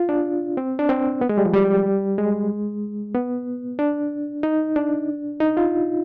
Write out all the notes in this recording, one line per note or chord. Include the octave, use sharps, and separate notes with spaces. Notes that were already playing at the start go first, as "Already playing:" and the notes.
Already playing: F4
D4
C4
D4
C4
B3
G#3
G3
F3
G3
G#3
B3
D4
D#4
D4
D#4
F4